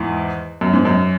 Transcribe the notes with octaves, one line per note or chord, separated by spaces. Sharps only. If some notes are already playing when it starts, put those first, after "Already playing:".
Already playing: E2 G#2
F#2
G#2
F#2